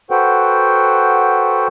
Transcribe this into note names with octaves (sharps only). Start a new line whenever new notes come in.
F#4 A4 B4 C5 F#5 G5